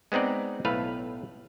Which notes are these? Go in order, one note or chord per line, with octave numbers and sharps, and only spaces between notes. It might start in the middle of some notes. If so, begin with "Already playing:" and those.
G#3 B3 C4 D#4 D5
B1 A2 A3 B4 F5